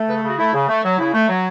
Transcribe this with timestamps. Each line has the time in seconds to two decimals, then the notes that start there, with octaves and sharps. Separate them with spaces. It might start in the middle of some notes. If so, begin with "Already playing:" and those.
Already playing: A3
0.08 C#3 B4
0.18 A4
0.23 C#3 F#4
0.38 A3 E4
0.54 C#3
0.68 A3
0.83 F#3
0.98 C#3 E4
1.14 A3
1.28 F#3